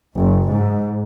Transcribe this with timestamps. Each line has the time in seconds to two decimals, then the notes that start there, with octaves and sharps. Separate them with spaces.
0.16 F#1
0.51 G#2